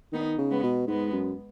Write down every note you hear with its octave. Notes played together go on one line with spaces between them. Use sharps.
D#3 B3 D#4
C#3
G#3 B3
B2
G#2 G#3 B3
F#2